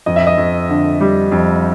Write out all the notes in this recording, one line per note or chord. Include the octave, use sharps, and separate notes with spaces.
F2 D#5
E5
D#5
F2
D3
G3
F2